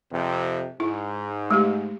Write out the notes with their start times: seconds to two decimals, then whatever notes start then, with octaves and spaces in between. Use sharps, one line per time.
0.11 F2 C3
0.80 G#2 E4
1.51 G#3 A3 G4